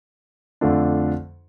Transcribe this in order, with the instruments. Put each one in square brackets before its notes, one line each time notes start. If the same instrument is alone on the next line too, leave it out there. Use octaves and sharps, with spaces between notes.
[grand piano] F2 D3 A3 D4 F4